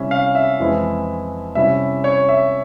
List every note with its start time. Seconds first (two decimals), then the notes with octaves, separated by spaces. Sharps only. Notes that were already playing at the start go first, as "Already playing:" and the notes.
Already playing: C3 G3 C#4 E4 E5
0.11 F5
0.35 E5
0.59 F2 E3 G#3 C4 E4
1.55 C3 G3 C#4 E4 E5
2.04 C#5
2.29 E5